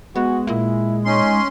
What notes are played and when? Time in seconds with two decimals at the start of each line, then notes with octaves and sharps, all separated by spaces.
0.16 G#3 B3 F#4
0.47 A#2 E4
1.05 C#4 D#4 C6